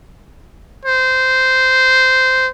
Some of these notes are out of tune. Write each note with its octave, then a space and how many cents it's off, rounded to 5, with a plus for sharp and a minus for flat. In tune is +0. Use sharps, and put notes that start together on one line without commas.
C5 -10